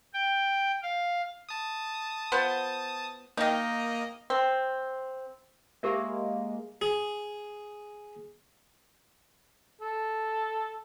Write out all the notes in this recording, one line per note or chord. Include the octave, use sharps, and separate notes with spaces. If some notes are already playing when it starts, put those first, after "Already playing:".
G5
F5
A5 D#6
B3 F4 C5
D#3 A#3 D#4 D#5
C4
G#3 A#3 G4 A#4 E5
G#4
A4